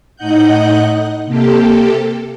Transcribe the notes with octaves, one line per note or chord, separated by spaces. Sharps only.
A2 D#4 D#5 F#5 F#6 G6
C3 A#3 G4 A4